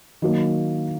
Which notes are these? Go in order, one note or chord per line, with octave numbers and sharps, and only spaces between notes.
D#3 F#3 A#3